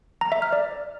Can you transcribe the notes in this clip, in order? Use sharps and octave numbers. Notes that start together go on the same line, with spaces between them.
A#5
E5
F6
D5